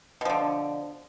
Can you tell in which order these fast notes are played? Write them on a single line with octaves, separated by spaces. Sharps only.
B2 F3 D3